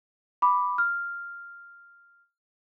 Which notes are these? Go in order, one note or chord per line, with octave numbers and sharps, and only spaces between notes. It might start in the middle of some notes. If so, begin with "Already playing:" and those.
B5 D6
F6